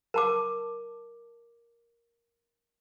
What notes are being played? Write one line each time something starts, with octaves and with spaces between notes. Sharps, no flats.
A#4 A5 D6